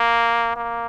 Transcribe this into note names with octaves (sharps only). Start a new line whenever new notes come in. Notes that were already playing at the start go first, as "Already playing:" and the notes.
Already playing: A#3
A#3